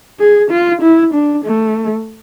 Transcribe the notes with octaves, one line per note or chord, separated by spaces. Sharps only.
G#4
F4
E4
D4
A3